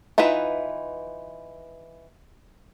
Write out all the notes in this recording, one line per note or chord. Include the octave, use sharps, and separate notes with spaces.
E3 D#4 F4 B4 E5